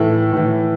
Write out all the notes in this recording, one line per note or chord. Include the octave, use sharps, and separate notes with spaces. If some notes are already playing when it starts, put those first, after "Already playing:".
Already playing: A2 E3 A4
A2 E3